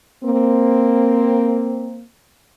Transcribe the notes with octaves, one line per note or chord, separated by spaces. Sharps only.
A#3 C4